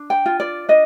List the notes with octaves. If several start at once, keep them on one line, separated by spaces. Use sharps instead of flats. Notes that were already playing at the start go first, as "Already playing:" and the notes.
Already playing: D4
G5
F4
D5
D4 D#5